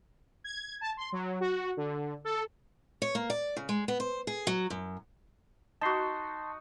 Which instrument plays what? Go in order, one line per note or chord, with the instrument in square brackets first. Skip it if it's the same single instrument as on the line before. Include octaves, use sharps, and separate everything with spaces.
[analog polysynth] G#6
A5
C6
F#3
F#4
D3
A4
[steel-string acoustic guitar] C#5
A#3
D5
C#3
G#3
B3
C5
G#4
F#3
F#2
[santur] D#4 F#4 [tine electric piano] A5 C6